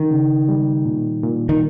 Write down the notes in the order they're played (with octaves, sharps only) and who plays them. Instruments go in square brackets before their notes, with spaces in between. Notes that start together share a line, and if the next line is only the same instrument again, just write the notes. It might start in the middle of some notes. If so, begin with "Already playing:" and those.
Already playing: [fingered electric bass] D#3
[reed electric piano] C#3
G3
A#2
A#2
[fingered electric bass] D#3